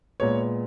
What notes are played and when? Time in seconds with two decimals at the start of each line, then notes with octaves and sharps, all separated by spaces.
0.20 A#2 G#3 B3 C#5